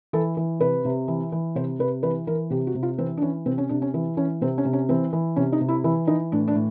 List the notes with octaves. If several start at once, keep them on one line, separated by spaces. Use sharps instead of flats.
E3 A4
E3
C3 B4
C3
E3
E3
C3 C5
C3 B4
E3 B4
E3 A#4
C3 G4
F#4
C3
F4
E3 C4
D4
E3 C#4
C3 C4
C#4
C3 D4
C#4
E3
E3 C#4
C3 C4
C#4
C3
C#4
E3 C4
E3
C3 C#4
D#4
C3
E4
E3 E4
E3 D#4
A2 D4
D4
A2